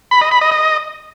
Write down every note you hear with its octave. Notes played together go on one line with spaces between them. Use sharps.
B5
D#5
B5
D#5
D#5